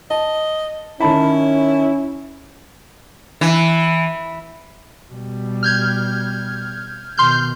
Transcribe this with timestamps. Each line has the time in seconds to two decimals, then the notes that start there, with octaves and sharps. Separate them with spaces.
0.11 D#5 A5
1.01 D#3 C#4 E4 A5 B5
3.41 E3
5.12 B2 G3
5.63 F6 G6 G#6
7.18 B2 D#3 C6 F6 G6